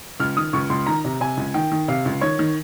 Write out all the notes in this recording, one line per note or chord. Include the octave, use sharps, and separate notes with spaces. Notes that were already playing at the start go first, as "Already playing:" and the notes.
C#2 F6
D#3 D#6
C#2 C#6
C#2 C6
D#3 A#5
C3
C3 G#5
C#2
D#3 G5
D#3
C3 F5
C#2
D#3 C#5
D#3